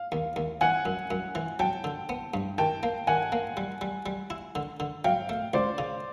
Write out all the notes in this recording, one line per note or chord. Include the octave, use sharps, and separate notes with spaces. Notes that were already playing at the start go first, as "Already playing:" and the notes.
Already playing: F5
D#2
D#2
E3 F#5 G#5
F#2
F#2
E3
F#3 G5 A5
D3
B3
G2
D#3 G5 A5
A#3
D#3 F#5 G#5
A#3
G3
G3
G3
E4
D3
D3
F#3 F5 G5
A3
C#2 C5 D5
C#3